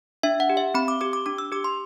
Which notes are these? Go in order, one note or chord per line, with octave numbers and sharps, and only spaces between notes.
D4 E5
F#5
G4
E5
C4 B5
D6
G4 D6
D6
D4 D6
E6
G4 D6
C6